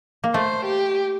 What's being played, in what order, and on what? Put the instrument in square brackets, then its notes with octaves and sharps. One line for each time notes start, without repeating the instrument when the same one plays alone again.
[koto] A#3
[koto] A3 [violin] C5
[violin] G4